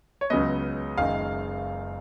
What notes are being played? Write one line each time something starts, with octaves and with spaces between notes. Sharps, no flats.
C#5
C#2 C#3 F#3 B3 D#5
F#1 F#2 D#3 G#3 F5